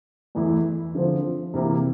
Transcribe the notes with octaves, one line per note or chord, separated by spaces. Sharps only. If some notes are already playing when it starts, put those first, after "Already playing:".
E2 E3 A3 E4
D3 F3 C4
C3 E3 A#3 E4 G4